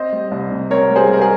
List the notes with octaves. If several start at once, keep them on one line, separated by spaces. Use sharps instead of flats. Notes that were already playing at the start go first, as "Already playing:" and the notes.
Already playing: C4 C5 D#5
G3
C2
C3
C4 A#4 C#5
G3
G#4 C5
C2 A#4
G#4